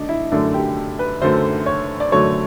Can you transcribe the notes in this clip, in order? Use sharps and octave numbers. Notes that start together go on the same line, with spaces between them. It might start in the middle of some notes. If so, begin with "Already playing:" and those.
Already playing: D3 A3 D4 D#4
E4
F#2 D3 F#3 A3 D4
G4
B4
F#2 D3 F#3 A3 C5
C#5
D5
F#2 D3 F#3 A3 C#5